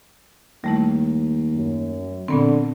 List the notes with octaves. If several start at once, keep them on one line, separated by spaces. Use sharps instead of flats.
D#2 G3 A3 E4
F#2
A#2 D3 B3 C4